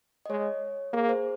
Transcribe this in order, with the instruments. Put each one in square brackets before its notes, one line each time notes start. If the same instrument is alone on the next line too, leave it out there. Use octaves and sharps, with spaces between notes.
[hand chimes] D#5
[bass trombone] G#3 [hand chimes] C#5
[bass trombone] A#3 [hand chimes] G#4
[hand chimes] C5